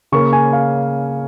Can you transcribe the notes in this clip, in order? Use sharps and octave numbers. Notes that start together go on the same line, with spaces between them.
C#3 A#3 C#4 C#6
G#5
F5